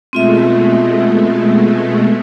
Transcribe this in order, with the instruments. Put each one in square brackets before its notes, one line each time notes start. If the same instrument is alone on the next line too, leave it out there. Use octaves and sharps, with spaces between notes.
[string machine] B2 G#3 A3 [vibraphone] C4 F4 E5